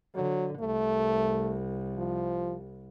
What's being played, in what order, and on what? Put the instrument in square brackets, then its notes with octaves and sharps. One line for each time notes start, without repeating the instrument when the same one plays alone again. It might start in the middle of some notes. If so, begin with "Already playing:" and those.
[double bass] D3 [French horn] F#3
[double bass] C2 [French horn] A3
[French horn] F3